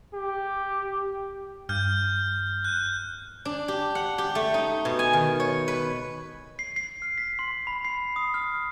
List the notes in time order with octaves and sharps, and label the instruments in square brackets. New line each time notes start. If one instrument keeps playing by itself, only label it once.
[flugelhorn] G4
[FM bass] G2 [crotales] F6 G6
[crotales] F#6 G6
[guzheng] D4
G4
F#5
G4
A3
D#4
B2
G#5
D#3
C#5
B4
[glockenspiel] C7
C7
F6
B6
C6
B5
C7
D#6
F6